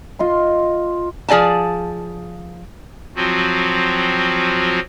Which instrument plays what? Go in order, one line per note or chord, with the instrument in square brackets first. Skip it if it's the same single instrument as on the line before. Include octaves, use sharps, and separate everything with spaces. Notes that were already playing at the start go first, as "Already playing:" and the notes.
[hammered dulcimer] F4 D#5 C6
[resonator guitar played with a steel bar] F3 G#4 D5 G#5 A5
[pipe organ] F3 F#3 C4 F4 F#4